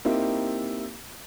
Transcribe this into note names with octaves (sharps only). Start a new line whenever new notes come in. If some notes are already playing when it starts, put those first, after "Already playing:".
A#3 C4 D#4 E4 G4